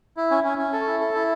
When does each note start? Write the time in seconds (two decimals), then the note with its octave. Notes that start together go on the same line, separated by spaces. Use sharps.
0.17 E4
0.31 C#4
0.44 C#4
0.58 C#4
0.73 A4
0.87 E4
1.01 A4
1.15 E4